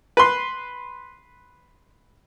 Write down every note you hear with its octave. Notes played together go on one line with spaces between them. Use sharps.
B4 C6